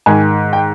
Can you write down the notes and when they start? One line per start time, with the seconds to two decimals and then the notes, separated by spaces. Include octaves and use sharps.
0.06 G#2 D#3 G#5
0.53 G5